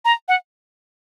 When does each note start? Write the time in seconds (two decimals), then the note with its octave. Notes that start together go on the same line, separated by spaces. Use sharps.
0.05 A#5
0.28 F#5